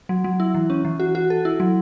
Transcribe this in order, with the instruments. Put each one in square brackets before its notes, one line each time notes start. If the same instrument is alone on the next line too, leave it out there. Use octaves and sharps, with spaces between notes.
[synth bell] F#3
F#3
E4
E3
C#4
E3
F#4
F#4
A4
E4
F#3